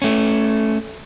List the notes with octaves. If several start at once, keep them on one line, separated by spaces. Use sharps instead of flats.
A3 C#4